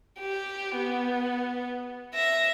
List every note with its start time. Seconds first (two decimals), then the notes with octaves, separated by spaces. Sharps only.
0.19 G4
0.76 B3
2.14 E5 A#6